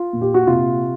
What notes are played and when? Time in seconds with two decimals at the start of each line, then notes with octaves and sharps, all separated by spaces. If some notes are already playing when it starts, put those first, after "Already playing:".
Already playing: F4
0.13 A#2
0.21 G4
0.34 F#4
0.47 C3 F4